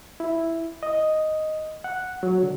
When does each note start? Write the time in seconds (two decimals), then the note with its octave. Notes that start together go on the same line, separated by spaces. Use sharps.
0.20 E4
0.83 D#5
1.84 F#5
2.23 F#3
2.43 D3